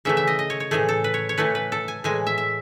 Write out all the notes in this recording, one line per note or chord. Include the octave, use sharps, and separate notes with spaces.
C#3 E3 A3 E5
E5
D#5
D#5
C#5
C#5
A2 E3 A3 G#4
A4
B4
C#5
C#5
A2 E3 A3 B4
B4
A4
G#5
A2 E3 G#3 G#5
E5
E5